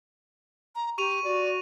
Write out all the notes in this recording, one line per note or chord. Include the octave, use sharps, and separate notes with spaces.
A#5
G4 C#6 D#7 F7
F#4 D5